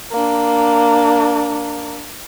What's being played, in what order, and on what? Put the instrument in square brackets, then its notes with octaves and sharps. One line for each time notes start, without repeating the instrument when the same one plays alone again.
[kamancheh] A#3 D4